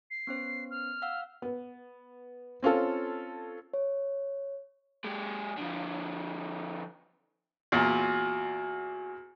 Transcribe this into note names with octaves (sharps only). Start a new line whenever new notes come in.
C7
B3 C#4 C5
F6
F5 F#5 E6
B3
C4 C#4 F4 A4
C#5
G#3 G4
D3 F3
E2 A#2 F#4 G#5